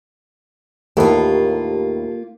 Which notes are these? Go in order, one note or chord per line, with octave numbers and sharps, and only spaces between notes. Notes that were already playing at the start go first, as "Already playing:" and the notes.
D#2 A2 A#3 B3 F4 G4 A4 A#4